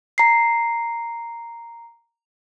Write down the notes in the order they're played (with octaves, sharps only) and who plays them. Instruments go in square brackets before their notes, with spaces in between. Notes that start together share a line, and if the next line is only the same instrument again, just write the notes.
[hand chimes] A#5 C7